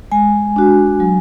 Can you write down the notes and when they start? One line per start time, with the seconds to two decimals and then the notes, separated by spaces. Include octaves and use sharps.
0.12 G#3 G#5
0.56 D4 F#4
1.00 F#3